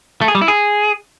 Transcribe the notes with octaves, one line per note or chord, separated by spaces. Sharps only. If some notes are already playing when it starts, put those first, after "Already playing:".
A3
G#4
G3
E4
G#4